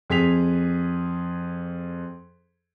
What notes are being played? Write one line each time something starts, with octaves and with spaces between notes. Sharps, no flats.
F2 G#4 B6 F7